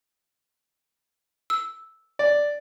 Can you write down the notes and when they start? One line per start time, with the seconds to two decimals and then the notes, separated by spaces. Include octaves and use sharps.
1.50 E6
2.19 D5